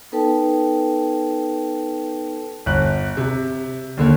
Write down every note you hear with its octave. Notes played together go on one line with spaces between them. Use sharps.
B3 D#4 A4 B4 G5 A5
G1 F#6
C3
D#2 D3 A#3